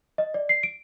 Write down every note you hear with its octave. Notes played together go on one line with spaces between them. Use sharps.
D#5
D5
C7
D7